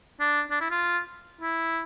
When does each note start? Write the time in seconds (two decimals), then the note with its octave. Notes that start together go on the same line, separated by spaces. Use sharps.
0.20 D4
0.51 D4
0.61 E4
0.71 F4
1.41 E4